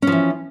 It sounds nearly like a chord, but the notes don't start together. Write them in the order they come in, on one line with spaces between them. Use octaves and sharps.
C#4 F3 E3